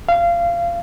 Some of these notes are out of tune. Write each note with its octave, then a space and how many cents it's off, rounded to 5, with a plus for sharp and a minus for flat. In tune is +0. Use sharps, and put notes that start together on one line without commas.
F5 -25